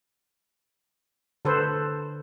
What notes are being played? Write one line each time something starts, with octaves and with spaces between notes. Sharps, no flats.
D3 A4 B4 C5